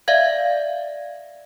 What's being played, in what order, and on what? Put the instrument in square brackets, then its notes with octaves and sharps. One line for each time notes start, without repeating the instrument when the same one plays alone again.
[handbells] D5 E5 F5 G#6